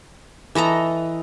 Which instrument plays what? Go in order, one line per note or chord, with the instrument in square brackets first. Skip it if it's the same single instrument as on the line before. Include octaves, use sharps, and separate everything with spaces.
[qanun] E3 A4 D#5 A#5